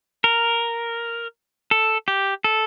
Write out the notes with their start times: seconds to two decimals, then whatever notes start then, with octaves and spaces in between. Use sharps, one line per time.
0.24 A#4
1.71 A4
2.08 G4
2.44 A4